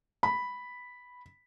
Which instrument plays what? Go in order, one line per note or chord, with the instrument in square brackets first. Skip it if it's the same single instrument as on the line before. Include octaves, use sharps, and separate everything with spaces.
[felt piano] B5